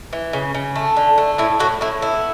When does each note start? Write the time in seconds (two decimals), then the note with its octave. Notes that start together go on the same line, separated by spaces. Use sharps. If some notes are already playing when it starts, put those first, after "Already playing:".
0.13 E3
0.33 C#3
0.54 C#3
0.76 A3
0.97 D3
1.18 A3
1.38 A2 E4
1.60 A2 F#4
1.81 A2 E4
2.02 B3 E4